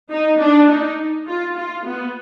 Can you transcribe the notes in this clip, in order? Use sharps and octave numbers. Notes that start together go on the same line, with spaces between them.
D#4
D4
D#4
F4
F4
B3